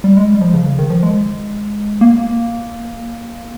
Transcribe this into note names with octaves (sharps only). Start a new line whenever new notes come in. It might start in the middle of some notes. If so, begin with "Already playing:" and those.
G3
G#3
G3
F3
C#3
C#3
D#3
F3
G#3
A#3